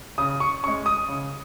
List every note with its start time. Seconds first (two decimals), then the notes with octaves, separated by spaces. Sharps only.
0.18 C#3 D#6
0.40 C#6
0.63 C#4 C#6
0.68 G#3
0.86 D#6
1.08 C#3